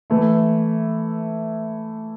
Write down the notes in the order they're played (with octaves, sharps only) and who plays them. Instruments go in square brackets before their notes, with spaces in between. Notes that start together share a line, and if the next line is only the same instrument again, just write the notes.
[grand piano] E3 A3 E4